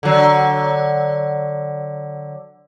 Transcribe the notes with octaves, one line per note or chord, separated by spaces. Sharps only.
D3 F#3